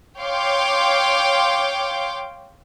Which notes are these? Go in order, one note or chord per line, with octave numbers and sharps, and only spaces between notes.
C#5 F5 G5 C6 D6